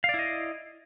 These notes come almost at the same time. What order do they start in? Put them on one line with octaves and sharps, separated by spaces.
F5 D5 E4 D#5